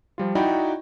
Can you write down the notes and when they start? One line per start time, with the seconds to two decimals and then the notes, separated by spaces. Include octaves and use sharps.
0.18 F3 G3 F4
0.35 D#4 E4 F#4 D5 G5 B5